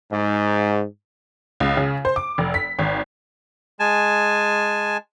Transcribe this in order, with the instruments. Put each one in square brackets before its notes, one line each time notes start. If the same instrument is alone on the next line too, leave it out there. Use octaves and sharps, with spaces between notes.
[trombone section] G#2
[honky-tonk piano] C#2
C#3
C5
D6
F1
B6
G#1
[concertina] G#3 G#5 A5